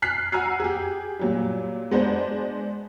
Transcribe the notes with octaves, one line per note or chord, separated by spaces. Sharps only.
F6 F#6 B6 C7
F#5 G#5 A#5 E6 F6 C7
G4 G#4
A#2 F#3 G3
G#3 B3 D4 C5